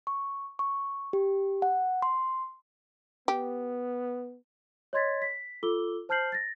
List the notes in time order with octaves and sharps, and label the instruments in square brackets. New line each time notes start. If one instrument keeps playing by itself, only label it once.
[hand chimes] C#6
C#6
G4
F#5
C6
[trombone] B3 [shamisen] G4
[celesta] C#5 D#5 C6 G#6 A6 B6
B6
F4 A4 D6 E6 G7
C5 A5 F6 G6 C7 F#7
A6 A#6